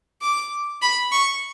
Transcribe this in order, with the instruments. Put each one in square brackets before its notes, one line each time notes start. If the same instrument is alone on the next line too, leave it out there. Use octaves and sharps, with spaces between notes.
[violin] D6
B5
C#6